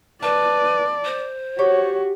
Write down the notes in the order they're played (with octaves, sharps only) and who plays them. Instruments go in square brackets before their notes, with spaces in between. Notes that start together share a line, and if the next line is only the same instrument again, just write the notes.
[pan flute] B4 [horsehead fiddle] D5 [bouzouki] A5
[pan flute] C5
[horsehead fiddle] F#4 [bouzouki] G4 [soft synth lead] C#5